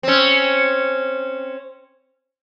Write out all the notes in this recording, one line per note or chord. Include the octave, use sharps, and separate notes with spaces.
C4 C#4